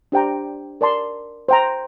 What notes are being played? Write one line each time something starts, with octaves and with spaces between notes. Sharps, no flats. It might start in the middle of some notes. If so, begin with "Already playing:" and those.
D4 G4 C5 G5 A#5
A#4 D5 A5 C6
C5 G5 A#5